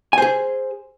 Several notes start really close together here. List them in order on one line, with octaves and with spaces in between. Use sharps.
G#5 C5 G#4